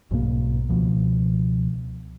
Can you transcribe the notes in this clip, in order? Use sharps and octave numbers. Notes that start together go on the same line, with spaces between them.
B1 G#2 B2 A#3
C#2 B2 F3